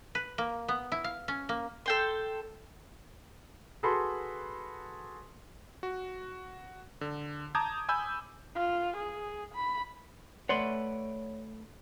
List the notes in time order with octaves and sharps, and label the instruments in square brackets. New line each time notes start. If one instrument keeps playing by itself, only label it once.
[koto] B4
A#3
B3
E4
F5
C#4
A#3
[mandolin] A4 G5 C6
[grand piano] F#4 G#4 A4 B4 B5 C6
[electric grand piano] F#4
D3
A5 A#5 D6 D#6 G6 G#6
G#5 B5 E6 G6
[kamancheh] F4
G#4
B5
[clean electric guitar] A3 B4 F#5 [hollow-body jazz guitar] C#5 D5 C6